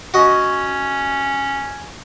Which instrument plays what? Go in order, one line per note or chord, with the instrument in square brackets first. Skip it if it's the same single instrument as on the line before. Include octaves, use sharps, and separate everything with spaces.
[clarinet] C#4 [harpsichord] F#4 D#5